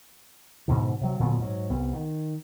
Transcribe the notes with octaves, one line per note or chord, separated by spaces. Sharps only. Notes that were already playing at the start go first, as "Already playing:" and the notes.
G#2 B2 D3
C3 F#3
A#2 D3 F#3 B3
G#2 F#3
C2 B3
D#3